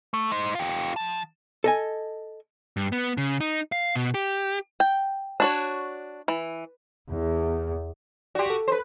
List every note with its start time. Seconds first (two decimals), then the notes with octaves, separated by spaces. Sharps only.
0.14 A3
0.32 D#4 C5
0.55 F4 G4
0.96 F3 A5
1.64 A4 D#5 G#5
2.77 G2
2.92 B3
3.18 C#3
3.41 D#4
3.72 F5
3.96 B2
4.14 G4
4.80 G5
5.40 D4 F#4 C#5
6.28 E3
7.10 E2
8.35 F#4 G4 D5 C6
8.50 A4
8.68 B4 C5